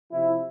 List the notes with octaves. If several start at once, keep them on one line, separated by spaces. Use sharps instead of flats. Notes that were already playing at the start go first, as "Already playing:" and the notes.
C3 F3 E4